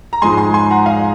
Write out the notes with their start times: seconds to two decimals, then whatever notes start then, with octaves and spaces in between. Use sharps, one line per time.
0.13 A#5
0.22 G#2 F3 G#3 G#5 C6
0.37 G#5 C6
0.54 G#5 C6
0.71 F#5 A#5
0.86 F5 G#5